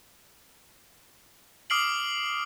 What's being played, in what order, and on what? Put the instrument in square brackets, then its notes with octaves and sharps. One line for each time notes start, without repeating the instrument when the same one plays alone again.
[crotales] D6 D#6 F6 C7 D7 F#7